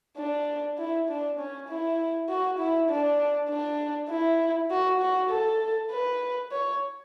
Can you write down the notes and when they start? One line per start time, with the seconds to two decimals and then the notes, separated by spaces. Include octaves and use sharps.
0.17 D4
0.78 E4
1.09 D4
1.39 C#4
1.69 E4
2.30 F#4
2.59 E4
2.90 D4
3.50 D4
4.10 E4
4.71 F#4
5.00 F#4
5.30 A4
5.90 B4
6.51 C#5